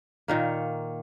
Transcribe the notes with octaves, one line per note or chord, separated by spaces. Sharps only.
A#2 D#3 A#3